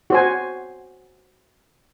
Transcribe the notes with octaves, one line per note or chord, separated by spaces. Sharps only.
F#4 C5 G#5